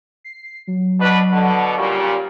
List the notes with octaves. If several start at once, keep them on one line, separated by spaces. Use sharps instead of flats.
C7
F#3
B2 D4 B4
B2 D3
A#2 C#3 G3 C#6